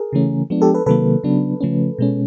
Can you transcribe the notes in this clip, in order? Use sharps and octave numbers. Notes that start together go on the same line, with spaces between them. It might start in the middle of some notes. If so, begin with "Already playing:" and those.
Already playing: G#4 A#4
C#3 E3 A3 C#4
F3 G#3 B3 D4
G4 A4
A4 B4
C3 D#3 F#3 A#3 A4 B4
C#3 F#3 B3 D4
C#3 F3 A3 C#4
B2 G#3 C#4